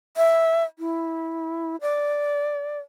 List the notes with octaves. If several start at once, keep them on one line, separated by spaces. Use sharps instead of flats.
E5
E4
D5